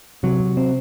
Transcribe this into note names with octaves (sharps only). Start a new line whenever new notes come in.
C3 F#3
C3
C4